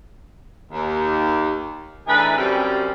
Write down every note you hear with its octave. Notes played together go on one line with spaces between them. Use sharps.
D#2
A2 E3 D4 D#4 G#4 B4
F#2 C3 G3 C4 C#4